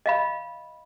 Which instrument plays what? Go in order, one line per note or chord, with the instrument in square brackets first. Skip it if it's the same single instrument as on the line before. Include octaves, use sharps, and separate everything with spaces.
[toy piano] D#5 F5 B5